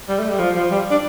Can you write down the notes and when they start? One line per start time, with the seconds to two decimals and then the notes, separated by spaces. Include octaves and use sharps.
0.08 G3
0.19 A3
0.29 G3
0.39 F3
0.55 F3
0.71 G3
0.91 D4